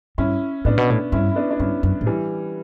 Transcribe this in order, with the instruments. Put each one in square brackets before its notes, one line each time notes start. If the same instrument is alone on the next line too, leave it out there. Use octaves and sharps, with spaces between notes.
[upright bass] G2 [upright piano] C#4 E4
[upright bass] A2 [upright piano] B3 D4
[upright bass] B2
A2
[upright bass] G2 [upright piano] C#4 E4
[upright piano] E4
B3 D4
D4
[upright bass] G2 [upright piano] C#4 E4
[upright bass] F#2
A2
[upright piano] E3 G3